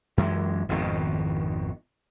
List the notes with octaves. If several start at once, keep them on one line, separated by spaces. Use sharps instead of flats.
F#2 E3 G#3
G#1 F2 B2 D#3